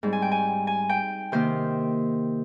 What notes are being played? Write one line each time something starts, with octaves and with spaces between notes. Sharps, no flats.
G#2 G3 C4
G#5
G5
G#5
G#5
G5
C3 D#3 A#3 C5